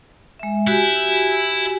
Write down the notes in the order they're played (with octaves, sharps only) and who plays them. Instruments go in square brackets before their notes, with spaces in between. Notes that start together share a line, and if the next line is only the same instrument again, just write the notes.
[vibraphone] G#3 E5
[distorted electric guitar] E4 [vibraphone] F#4 G4 G#5